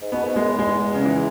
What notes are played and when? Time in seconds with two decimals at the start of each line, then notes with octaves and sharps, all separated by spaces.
0.02 G#2
0.12 B2 B3
0.24 G#2
0.36 F#2 G#3
0.47 E2
0.59 G#3
0.94 C#3
1.05 E3